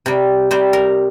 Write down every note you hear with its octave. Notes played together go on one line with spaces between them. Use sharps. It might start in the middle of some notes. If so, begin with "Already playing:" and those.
C3 G3
C3 G3 C5
A#4